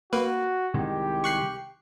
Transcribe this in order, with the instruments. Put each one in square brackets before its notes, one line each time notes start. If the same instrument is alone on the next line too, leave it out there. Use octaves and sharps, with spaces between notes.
[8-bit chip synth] A#3 B4 [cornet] F#4
[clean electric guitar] C2 D#3 G#3 [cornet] G4
[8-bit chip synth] C#6 F#6 C7